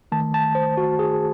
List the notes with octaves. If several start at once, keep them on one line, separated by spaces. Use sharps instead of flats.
D#3 A3 A5
A5
C5
F#4
G#4